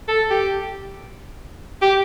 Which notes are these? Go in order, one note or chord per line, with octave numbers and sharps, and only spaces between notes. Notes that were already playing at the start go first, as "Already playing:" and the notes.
A4
G4
G4